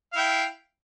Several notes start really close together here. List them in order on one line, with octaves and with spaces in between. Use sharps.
F5 E4 G5